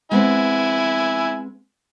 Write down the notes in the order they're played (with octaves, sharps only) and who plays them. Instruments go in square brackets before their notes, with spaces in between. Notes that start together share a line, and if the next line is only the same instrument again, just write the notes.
[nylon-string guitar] G#3 B3 C4 [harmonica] E4 G#5